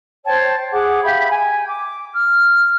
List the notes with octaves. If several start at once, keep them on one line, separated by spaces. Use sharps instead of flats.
C5 C#5 G5 A5
G#4 F#5 D6
G4 E5 F5 B5
G5 G#5
D6
F6